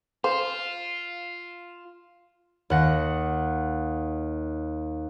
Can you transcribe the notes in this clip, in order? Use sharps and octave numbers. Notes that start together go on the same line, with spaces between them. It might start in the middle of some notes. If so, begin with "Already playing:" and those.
F4 C5 F5 E7
D#2 F#5 A#6